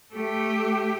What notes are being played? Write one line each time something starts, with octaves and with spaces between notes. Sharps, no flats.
A3 G4